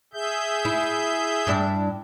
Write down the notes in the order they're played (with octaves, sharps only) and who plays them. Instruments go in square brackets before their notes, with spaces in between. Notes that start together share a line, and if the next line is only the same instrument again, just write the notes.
[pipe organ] G#4 E5 G6
[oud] E4
G2 D4 E4